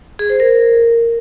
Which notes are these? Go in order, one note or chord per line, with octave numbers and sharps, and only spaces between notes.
G#4
C5
A#4